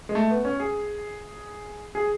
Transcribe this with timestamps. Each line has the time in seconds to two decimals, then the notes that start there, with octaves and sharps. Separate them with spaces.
0.09 G#3
0.15 A3
0.30 B3
0.45 C#4
0.60 G#4
1.95 G#4